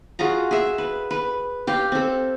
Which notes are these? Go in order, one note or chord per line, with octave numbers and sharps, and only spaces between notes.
F4 F#4 G#4 A#5
G#4 E5
B4
B4
G4 F5 G5
C4 A4